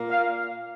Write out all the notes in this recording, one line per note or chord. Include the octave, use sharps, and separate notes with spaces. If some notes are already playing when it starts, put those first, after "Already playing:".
Already playing: A#2 A#3
F5